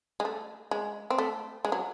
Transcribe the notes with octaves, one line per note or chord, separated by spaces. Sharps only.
G#3
A3
G#3
C4
A3
G#3
F#3